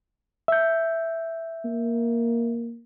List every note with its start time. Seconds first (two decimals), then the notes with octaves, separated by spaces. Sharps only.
0.48 E5 G6
1.65 A#3